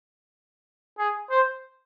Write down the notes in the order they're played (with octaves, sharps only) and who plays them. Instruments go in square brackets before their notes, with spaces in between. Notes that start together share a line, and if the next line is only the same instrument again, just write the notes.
[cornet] G#4
C5